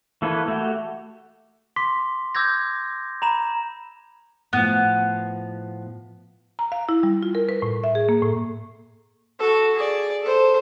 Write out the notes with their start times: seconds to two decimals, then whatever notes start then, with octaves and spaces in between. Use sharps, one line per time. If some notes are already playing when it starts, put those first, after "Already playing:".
0.22 E3 A#3 A4 B4 C#5
0.48 A3 F#4 G4
1.76 C6 D6 B6
2.35 D6 E6 G6 G#6 A#6
3.22 A#5 B5 E7
4.53 A2 F3 B3
6.59 A#5
6.72 F5
6.89 E4
7.03 G3
7.23 F4
7.35 A#4
7.49 B4
7.62 A2
7.84 E5
7.95 G#4
8.09 A#3
8.22 A2
9.39 F#4 A4
9.75 G#4 D5
10.22 A4 C5